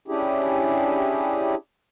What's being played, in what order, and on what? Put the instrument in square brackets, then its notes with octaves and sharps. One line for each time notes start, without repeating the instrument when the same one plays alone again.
[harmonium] C#4 D4 E4 G4 G#4